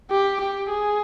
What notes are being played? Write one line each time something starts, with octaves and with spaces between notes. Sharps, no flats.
G4
G4
G#4